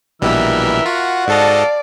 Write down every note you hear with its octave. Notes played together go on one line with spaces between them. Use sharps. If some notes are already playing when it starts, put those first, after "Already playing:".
A#1 B2 E3 G3 A#4 E5 E6
F4 F#4 F#5
G#2 A4 D5 D#5 F5 A5